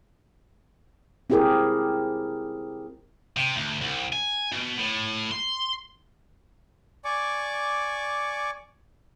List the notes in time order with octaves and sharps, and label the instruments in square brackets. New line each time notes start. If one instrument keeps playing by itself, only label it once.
[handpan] C4 E4 G4 G#4 A#4
[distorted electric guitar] C3
D2
C2
G#5
B2
A2
C6
[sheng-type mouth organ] D5 G#5 C#6 D6